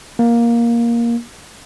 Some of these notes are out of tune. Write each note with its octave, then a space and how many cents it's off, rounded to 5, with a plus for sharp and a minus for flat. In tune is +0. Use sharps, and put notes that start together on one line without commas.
A#3 +10